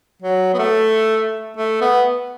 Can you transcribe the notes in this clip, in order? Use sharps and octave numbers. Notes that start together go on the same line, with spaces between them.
F#3
B3
A3
A3
B3